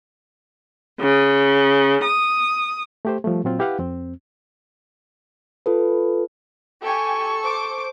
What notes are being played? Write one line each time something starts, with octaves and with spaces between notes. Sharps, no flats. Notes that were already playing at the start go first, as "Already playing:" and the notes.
C#3
D#6
A3 G4 C5
F3 G3 A3
A#2 F#3 C4 F4
E4 G4 B4 F5 F#5
F2 C4
F4 A4 B4
G4 A4 G#5 C#6
C5 D6